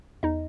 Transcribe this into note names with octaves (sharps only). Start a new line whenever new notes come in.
E2 D#4 D#5